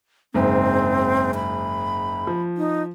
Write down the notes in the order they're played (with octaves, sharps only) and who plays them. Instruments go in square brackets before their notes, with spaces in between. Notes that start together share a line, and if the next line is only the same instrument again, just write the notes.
[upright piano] F#1 G#2 [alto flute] C4
[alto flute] B5
[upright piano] F3
[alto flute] D#4